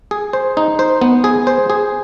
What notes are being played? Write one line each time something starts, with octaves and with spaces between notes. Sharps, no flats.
G#4
C5
D#4
C5
B3
G#4
C5
G#4